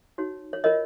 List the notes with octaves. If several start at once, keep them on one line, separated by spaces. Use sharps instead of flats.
D#4 F#4 C#5
C#5
F4 A#4 C#5 D#5